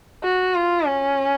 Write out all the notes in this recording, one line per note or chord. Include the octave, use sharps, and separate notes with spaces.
F#4
F4
C#4